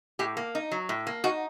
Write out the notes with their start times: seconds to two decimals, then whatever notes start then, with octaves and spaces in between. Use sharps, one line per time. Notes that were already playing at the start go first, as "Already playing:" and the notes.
0.19 A2 G4
0.37 A#3
0.55 D#4
0.72 F#3
0.89 A2
1.07 A#3
1.24 D#4 F#4